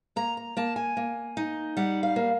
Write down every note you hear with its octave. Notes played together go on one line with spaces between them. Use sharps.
A#3 A#5
A#5
A#3 A5
G#5
A#3
D#4
G3 F#5
F5
A#3